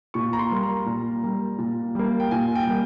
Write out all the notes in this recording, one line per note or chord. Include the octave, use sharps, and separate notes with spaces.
A#2 C#6
A#5
C6
G3 A#3
A#5
A#2
G3 A#3
A#2
G3 A#3
G5
A#2 G#5
G5
G3 A#3